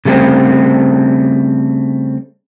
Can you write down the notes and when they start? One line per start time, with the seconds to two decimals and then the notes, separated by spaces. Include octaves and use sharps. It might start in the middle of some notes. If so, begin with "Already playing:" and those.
0.05 C#3 G3 A3 A#3 C4